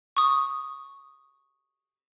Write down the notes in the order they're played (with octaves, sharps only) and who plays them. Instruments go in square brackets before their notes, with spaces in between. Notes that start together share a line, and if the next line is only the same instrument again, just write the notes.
[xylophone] C#6 D#6